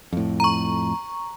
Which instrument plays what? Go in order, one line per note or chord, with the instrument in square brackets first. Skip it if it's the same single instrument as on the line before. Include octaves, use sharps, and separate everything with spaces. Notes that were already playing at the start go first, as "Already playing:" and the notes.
[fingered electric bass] F2 A2
[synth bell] A#5 C#6